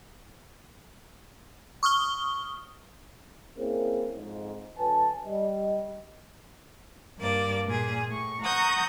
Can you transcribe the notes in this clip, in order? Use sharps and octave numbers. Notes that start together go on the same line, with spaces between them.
C#6 D#6 F6 G7
A#3 C4 C#4 E4 G#4 A#4
F2 G#2
D3 F#3 B4 G#5 A5
G3 D#5
G2 A#3 D5
A#2 G#4
A2 C#6
F#5 A#5 C#6 D#6 G6